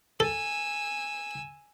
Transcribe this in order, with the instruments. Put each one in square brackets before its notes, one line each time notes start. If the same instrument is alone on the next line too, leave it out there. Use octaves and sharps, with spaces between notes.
[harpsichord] A4 [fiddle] G#5 E6